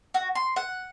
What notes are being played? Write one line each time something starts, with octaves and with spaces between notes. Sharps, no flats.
F#4
C6
F#5